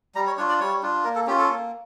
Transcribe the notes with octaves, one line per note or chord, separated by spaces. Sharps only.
G3 A#5
C#5
D4 F4 C#5
D5
G3 C#5
D4 F4
A#3 A#4
A4
C#4 F4 G4
A4
A#3